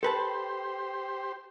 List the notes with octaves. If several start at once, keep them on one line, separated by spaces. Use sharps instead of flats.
G4 A4 B4 C5 A5